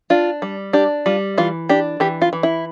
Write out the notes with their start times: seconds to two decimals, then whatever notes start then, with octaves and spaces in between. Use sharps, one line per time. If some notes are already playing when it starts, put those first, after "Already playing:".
0.10 D4 F4
0.42 G3
0.73 D4 G4
1.06 G3 F4
1.38 E3 F4
1.69 D4 G4
2.00 E3 G4
2.22 F4
2.33 E3
2.43 E4